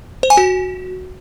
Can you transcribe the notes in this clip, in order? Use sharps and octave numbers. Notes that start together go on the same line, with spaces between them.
C5
G#5
F#4